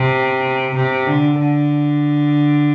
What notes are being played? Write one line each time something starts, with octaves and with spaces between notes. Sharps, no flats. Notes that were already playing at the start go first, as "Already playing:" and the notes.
Already playing: C3
C3
D3
D3